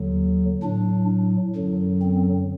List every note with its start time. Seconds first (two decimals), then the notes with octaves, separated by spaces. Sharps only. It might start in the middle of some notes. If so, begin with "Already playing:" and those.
Already playing: D#2 D3 F#3
0.63 A2 F#3 D4
1.55 F#2 D3 F#3
2.02 C4